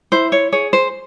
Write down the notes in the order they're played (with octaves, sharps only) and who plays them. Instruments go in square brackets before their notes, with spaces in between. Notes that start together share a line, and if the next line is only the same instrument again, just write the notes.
[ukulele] E4 C5
C#5
G#4 C#5
C5